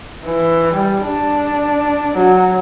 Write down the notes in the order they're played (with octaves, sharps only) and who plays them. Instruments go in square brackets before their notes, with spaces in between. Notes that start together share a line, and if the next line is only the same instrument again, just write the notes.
[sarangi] E3
G3
D4
F#3